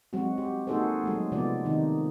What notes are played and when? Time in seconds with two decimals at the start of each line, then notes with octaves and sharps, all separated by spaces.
0.13 F#3 G#3 C4 F#4
0.38 G4
0.67 A#3 D#4 F#4 G#4 A4 C5
1.04 F#3 G#3 A3
1.32 C3 F3 G#3 B3 D5
1.65 D#3 C4 D#4